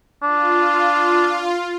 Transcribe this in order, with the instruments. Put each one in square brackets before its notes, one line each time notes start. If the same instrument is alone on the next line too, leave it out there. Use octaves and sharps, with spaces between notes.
[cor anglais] D4 [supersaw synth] F4